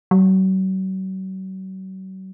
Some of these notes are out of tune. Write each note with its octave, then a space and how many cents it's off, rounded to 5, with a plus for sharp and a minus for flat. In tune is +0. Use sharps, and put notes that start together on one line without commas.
F#3 +40